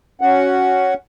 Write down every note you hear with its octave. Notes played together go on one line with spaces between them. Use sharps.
C#4 F#4 F#5